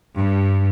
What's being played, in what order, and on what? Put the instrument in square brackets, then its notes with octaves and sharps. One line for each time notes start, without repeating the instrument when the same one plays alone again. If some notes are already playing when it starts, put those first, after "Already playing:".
[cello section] G2